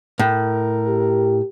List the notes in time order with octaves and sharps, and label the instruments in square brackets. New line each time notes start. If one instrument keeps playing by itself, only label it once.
[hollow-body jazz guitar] A2 [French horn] A#4
[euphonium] G4